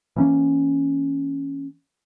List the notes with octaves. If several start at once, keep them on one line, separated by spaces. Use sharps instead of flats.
E3 A#3 C#4